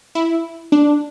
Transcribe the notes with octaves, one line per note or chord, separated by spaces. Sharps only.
E4
D4